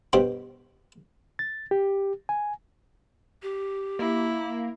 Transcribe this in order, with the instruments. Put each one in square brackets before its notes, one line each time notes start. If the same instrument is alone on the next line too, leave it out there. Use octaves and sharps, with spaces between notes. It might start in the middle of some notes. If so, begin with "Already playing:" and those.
[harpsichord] G2 B2 G4 C5 B5
[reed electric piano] A6
G4
G#5
[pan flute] G4
[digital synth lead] A#3 [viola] E4